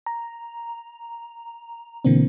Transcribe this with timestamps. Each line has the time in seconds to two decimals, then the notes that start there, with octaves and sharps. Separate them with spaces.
0.06 A#5
2.05 B2 D3 E3 A#3 C4